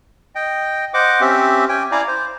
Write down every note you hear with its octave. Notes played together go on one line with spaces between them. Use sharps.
D#5 G5
C5 D#5 F#5 D6
C4 C#4 G4 E5
C#4 G5 G#5
E4 D5 F5 G#5 A#5
C5